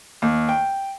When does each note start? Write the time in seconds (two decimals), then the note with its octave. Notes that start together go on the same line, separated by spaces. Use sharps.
0.22 D#2
0.49 G5